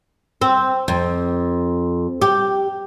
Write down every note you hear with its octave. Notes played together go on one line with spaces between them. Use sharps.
C4
F2
G4